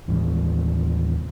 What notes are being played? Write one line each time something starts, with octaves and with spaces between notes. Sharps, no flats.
D#2 A2 E3